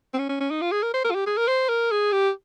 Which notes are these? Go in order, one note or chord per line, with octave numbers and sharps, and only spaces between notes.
C4
C#4
C#4
C#4
D#4
F4
G#4
A#4
C5
A#4
F4
G4
G#4
A#4
C5
A#4
G#4
G4